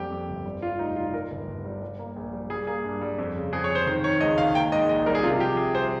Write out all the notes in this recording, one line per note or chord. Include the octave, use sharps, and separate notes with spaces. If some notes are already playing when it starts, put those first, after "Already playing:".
Already playing: F2 G3 A#3 G4
F2
G1
G3
G3 F4
F1 D#4
G3 F4
G3 A#4
G1
G1
G3
G3
A#3
A#1
G3
G3 G#4
A#3 G#4
G2
G3
F2
C#3
F2 G#4
C#5
F2
C5
D#3 C5
D#3 C#5
C#2 D#5
D#3 F5
A#3 G5
G#2 D#5
A#1 D#5
G3 A#4
G#4
C3 F4
F3 G4
C2 G#4
C2 C5